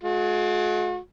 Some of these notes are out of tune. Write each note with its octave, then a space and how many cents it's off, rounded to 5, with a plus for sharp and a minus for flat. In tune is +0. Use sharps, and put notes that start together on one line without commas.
G#3 +40 F#4 -45